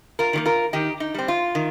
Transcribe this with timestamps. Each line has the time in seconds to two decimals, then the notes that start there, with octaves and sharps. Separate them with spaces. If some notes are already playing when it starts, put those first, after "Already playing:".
0.19 F4 A#4
0.33 D#3 G3 A#3
0.45 F4 A#4
0.73 D#3 D#4 G4
1.00 D#4
1.14 G3 C4
1.28 F4
1.55 D#3